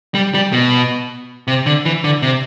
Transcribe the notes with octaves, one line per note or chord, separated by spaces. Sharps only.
G3
G3
B2
C3
D3
E3
D3
C3